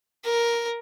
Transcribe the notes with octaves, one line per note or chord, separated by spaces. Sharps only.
A#4